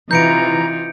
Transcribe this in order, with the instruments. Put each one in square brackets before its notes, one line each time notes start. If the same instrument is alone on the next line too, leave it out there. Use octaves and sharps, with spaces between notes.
[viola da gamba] C3 D#4 F4 [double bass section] E3 [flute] A#5 [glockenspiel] G6 C#7 D7